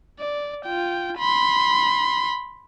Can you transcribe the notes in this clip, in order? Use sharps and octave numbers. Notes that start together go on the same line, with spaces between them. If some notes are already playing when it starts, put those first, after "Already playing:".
D5
F4 G5
B5 C6